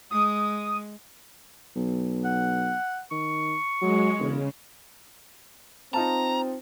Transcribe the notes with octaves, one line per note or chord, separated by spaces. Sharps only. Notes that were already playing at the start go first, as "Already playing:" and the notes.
G#3 D#6
B1
F#5
D#3 C#6
F#3 G#3
E1 C#3
C4 D#4 F4 A5 A#5